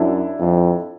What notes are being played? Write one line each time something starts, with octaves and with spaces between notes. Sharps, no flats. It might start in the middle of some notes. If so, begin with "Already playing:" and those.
Already playing: F#2 D4 E4
F2